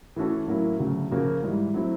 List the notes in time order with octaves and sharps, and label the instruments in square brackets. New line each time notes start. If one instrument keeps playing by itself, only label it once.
[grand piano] E3 A3 C#4 F#4 A4
A2 F#3 A#3 C#4 E4
D2 C#3 F#3
C#3 F3 A#3 C#4 F#4
G#2 E3 G3
F#3 A3 C4 E4